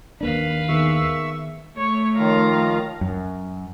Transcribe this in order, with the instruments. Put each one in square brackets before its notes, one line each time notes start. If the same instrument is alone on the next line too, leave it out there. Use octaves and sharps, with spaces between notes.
[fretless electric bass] D#2 A#3 D4 [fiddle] B4 F5
[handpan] D#3 B3 G#4 [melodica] E5 C#6 E6
[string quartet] A3 [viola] C#5
[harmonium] D#3 F3 F4 [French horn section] C#5 [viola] F5 A#5
[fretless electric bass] F#2